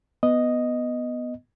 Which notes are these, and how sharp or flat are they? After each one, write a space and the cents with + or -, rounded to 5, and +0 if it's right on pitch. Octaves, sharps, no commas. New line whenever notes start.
B3 +0 D#5 +0